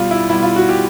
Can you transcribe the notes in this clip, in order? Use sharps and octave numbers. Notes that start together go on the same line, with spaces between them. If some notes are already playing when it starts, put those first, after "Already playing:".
Already playing: B2 G3 F4
E4
B2 G3 E4
F4
F#4
G4